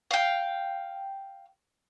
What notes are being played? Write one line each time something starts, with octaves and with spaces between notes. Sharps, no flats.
F5 G5